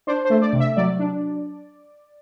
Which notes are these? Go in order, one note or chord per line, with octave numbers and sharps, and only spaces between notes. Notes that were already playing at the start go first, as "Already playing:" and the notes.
D4 C5
C5
A3
D5
C3
E5
F#3 D5
D4